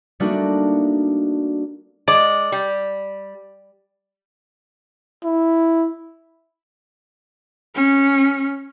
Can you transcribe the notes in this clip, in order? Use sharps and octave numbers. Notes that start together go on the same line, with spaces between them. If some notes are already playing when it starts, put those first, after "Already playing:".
G3 A3 A#3 D4 D#4 F#4
G#3 D5
G3
E4
C#4